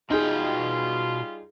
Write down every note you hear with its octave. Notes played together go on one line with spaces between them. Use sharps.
B2 G3 D#4 F4 G#4 G5